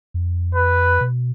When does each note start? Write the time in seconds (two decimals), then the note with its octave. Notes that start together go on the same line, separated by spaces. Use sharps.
0.14 F2
0.55 B4
1.01 B2